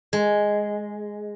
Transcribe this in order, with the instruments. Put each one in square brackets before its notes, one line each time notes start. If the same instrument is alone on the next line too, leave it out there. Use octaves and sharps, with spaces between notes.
[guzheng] G#3